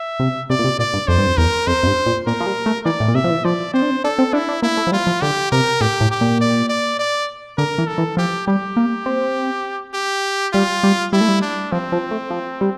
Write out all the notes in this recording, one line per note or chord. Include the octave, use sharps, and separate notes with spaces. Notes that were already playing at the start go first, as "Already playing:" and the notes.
Already playing: E5
C3
C3 D5
A#2
C3
A#2 D5
G2
F2 C5
G2
F2
E2 A#4
F2 C5
F2
G2
A#2
A#2 A#4
F3
G3
A3
E3 D5
A2
A#2
C3 E5
F3
E3
F3 D5
C4 C5
D4
C4
D4 A4
C4
D4 E4
D4
A#3 E4
A3
F3
G3 F4
F3
D3 G4
C3 A#4
A2 G4
A2
G4
A#2
D5
D5
D5
D3 A#4
E3
A4
E3
F3 G4
G3 G4
A#3
C4
G4
G3 F4
G3
G3 E4
A3
G3
D4
F3 C4
F3
A3
F3
G3